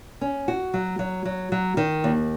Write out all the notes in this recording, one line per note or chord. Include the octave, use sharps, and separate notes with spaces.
C#4
F#4
F#3
F#3
F#3
F#3
D#3
D#2